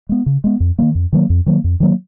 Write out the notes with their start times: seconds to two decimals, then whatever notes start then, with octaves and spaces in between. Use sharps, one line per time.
0.09 G#3 B3
0.26 C#3
0.44 G#3 B3
0.60 F2
0.79 F#3 A#3
0.82 D#3
0.95 F2
1.13 D#3 F#3 A#3
1.30 F2
1.46 D#3 F#3 A#3
1.64 F2
1.80 D#3 F#3 A#3